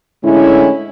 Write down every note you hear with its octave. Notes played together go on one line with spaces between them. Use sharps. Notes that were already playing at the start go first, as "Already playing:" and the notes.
A2 D3 G#3 C#4 E4